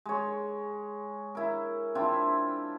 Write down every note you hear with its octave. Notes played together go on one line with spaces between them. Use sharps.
G#3 C#5
E4 A#4
C4 D4 E4 F4